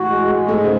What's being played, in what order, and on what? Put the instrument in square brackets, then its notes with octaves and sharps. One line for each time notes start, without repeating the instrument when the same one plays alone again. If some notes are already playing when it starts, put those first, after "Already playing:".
Already playing: [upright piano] A2 E3 [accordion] F#4
[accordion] G#3
G#3
[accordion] G#2 [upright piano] A3
[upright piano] C#3